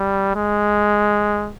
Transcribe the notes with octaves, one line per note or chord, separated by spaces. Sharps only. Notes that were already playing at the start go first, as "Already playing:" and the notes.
Already playing: G3
G#3